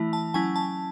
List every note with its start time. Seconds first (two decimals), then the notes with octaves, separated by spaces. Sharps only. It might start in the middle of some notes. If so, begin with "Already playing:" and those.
Already playing: E3 A3 E4
0.13 A5
0.34 F#3 C#4 E4 G#5
0.56 A5